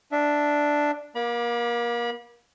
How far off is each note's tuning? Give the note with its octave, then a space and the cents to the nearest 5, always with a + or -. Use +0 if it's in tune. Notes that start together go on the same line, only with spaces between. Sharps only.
D4 +0 E5 +0
A#3 +30 B5 -35 D6 +5